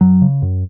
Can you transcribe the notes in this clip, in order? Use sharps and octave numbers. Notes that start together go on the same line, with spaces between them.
F#2 F#3
C#3
F#2